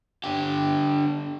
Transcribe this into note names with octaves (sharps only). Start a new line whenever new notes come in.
D3 G4